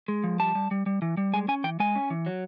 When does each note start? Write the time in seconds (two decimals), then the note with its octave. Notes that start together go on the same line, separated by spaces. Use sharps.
0.08 G#3
0.24 F3
0.40 G3 A5
0.55 G3
0.71 G3
0.86 G3
1.02 E3
1.17 G3
1.34 G#3 G#5
1.48 C#4 G#5
1.64 E3 G5
1.80 G#3 G#5
1.95 C#4
2.10 E3
2.26 F#3